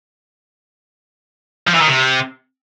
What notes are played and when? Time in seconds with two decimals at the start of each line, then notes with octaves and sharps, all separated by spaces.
1.67 F3
1.74 E3
1.81 D#3
1.88 C3